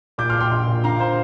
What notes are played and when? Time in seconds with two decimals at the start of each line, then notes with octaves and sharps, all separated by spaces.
0.18 A#2 D6 G6
0.29 C6 F6
0.35 A#2
0.40 G5 C6
0.51 A#1
0.68 A#2
0.84 D3 F5 A#5
1.00 C5